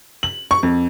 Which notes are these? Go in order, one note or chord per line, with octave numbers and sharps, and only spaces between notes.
F#7
C#6
F2